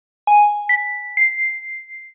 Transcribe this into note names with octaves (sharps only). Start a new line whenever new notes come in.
G#5
B6
C7